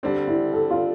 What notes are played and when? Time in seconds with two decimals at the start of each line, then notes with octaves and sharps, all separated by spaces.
0.03 D3 G3 C4 D4
0.28 E4
0.53 A4
0.70 F4